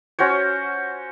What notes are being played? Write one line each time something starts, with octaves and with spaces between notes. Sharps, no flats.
C#4 F#4 C5 C#5